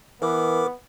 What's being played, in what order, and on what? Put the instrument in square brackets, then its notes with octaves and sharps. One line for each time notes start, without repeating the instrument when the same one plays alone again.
[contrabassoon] E3 [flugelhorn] B3 [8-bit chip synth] A#4 D6